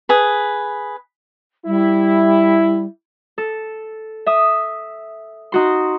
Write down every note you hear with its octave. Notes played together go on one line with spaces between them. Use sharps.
G#4 B4
G3 E4
A4
E5 D#6
D#4 F#4 C6